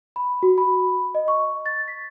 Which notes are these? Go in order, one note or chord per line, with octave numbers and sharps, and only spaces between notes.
B5
F#4
B5
D#5
C#6
A6
B6